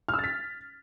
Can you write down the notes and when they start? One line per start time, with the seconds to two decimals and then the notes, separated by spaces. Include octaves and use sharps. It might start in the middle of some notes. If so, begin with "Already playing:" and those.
0.08 F6
0.14 E6
0.19 A6
0.24 B6